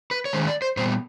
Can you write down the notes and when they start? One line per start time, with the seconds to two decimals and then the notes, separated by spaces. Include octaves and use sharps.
0.11 B4
0.25 C#5
0.33 D#3 G#3 C#4 C5
0.48 D5
0.62 C5
0.77 A#2 G3 B3 C5